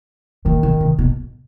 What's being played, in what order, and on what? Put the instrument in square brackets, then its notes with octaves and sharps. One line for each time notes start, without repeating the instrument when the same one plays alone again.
[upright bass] A#2 [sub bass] D#3
[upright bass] B2
C3
B2